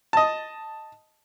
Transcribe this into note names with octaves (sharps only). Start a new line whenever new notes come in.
D#5 A5